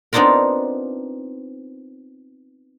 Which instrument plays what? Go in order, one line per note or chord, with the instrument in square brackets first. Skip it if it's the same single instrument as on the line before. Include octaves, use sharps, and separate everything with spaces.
[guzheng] B3 C4 D4 D#4 F4 A#4